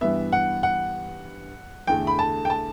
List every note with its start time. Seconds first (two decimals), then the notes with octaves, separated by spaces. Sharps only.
0.01 G2 E3 B3 E5
0.32 F#5
0.63 F#5
1.87 E2 D3 A3 G5
2.07 B5
2.19 A5
2.45 G5
2.50 A5